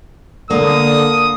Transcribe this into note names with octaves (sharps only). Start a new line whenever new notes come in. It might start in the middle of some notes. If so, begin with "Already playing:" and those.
D3 A#3 D#6